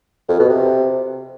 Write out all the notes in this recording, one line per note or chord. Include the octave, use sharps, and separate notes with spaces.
F2
B2
C3